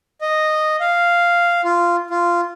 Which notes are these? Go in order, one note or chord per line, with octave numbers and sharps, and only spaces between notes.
D#5
F5
F4
F4